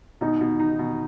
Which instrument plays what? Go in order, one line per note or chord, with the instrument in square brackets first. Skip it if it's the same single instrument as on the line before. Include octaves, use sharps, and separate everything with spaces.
[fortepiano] B2 [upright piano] D#4
[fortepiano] B2
D#4
B2